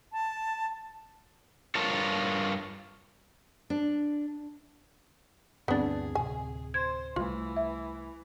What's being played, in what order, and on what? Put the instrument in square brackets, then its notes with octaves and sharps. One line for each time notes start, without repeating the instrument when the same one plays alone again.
[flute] A5
[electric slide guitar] G2 F4 A#4 C#5 A5
[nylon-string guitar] D4
[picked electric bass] D2 G2 E3 [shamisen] B3 D4 [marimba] C4 A6 [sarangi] G#4
[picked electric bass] D1 C3 [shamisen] G#5
[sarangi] C5 [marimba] G#6
[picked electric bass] C2 G3 A3 [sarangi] E3 [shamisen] F4
[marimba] E5